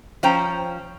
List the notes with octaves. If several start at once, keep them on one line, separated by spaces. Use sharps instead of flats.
F3 C#4 C5 G5 A#5